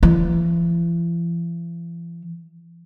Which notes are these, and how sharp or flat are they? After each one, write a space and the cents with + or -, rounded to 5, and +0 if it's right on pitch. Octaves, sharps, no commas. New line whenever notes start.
E3 +45